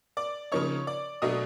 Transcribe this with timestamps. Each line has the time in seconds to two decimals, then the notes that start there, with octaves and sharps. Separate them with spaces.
0.17 D5 D6
0.52 C#3 F3 A#3 D#4 C#5 C#6
0.87 D5 D6
1.22 B2 F#3 A3 D4 D#5 D#6